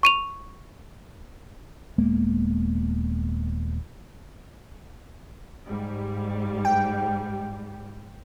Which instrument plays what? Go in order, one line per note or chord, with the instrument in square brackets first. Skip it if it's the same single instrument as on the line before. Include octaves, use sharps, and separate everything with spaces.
[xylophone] C#6 D#7 F7
[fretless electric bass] D#1 G#3 A#3 B3
[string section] G#2 G3
[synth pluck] G5